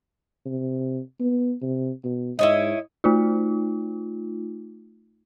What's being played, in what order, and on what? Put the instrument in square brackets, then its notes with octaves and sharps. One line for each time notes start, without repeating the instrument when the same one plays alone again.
[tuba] C3
B3
C3
B2
[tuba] G#2 [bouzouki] E4 C#5 D#5
[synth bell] A3 D#4 F4